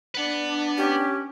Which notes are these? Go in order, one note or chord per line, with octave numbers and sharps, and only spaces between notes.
D4 B4 F#5
C#4 G4